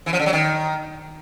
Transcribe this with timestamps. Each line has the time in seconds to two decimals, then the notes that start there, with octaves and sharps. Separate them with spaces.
0.06 E3
0.13 F3
0.20 D3
0.26 F#3
0.33 D#3